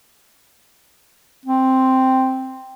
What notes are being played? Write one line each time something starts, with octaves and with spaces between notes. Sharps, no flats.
C4